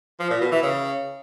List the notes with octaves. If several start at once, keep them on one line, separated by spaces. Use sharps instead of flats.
F3
A#2
B2
E3
C#3